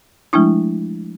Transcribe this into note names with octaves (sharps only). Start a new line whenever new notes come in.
F3 G#3 A3 D4 E4